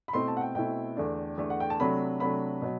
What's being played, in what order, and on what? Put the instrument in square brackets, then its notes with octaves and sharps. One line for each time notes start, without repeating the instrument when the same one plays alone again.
[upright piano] B5
B2 A3 C4 E4 C6
A5
F#5
G5
B2 A3 C4 E4 G5
E2 D3 A3 D4
E2 D3 A3 D4
F#5
G5
A5
C3 F#3 A3 D4 B5
C3 F#3 A3 D4 B5
B2 F#3